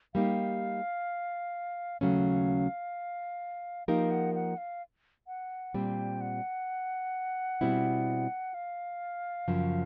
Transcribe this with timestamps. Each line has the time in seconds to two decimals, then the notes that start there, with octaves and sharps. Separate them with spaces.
0.15 G3 A#3 D#4 G4 F5
2.01 D#2 C#3 F#3 A3 C#4 F5
3.88 F3 A#3 D#4 G4 A#4 F5
4.11 F#5
4.35 F#5
4.58 F5
5.27 F#5
5.74 A#2 G3 C4 G5
6.21 F#5
7.61 B2 G3 C4 E4
8.54 F5
9.48 F#2 C#3 F3